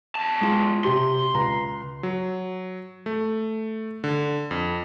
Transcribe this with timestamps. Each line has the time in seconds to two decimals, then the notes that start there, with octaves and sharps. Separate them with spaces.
0.15 E2 A5
0.41 G#3 F4
0.84 C3 G4 C6
1.34 C#2 A#5
2.03 F#3
3.06 A3
4.04 D3
4.51 F2